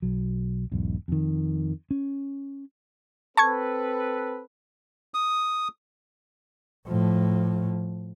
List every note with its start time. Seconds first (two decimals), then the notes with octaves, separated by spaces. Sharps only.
0.02 B1 F#3
0.72 E1 B1 G#2
1.08 F2 D#3
1.91 C#4
3.37 C4 A4 B4 A5 C#6 G#6
5.14 D#6
6.88 A2 F3